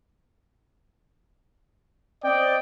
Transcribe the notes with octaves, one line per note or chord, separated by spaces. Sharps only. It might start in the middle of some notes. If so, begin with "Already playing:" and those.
C4 D5 D#5 G5